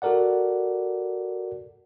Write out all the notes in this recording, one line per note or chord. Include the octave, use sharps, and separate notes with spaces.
F#4 A4 A#4 D5 F#5